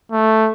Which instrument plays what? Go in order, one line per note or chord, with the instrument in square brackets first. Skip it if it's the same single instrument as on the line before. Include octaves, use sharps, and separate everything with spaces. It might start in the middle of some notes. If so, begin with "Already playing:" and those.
[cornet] A3